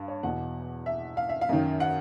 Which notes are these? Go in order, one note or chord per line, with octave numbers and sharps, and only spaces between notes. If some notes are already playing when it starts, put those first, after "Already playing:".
Already playing: G2 F5
C#5
E2 B2 F#5
E5
F5
E5
F5
F#2 D#3
F#5